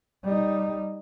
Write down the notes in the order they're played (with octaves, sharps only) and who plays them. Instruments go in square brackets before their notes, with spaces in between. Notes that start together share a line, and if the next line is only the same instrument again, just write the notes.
[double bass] G3 D#4